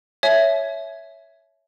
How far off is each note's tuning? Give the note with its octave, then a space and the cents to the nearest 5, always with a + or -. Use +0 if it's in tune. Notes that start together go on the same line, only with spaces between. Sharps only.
C#5 +5 E5 +0 G#5 +40